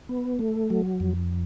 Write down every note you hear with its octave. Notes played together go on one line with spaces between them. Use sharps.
B3
A3
F#3
F2